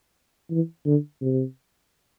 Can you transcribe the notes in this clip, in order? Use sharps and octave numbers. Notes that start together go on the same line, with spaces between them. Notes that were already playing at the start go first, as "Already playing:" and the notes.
E3
D3
C3